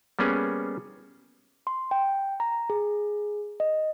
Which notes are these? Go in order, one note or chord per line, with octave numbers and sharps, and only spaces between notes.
G3 A#3 B3 C#4 G#4
C6
G5
A#5
G#4
D#5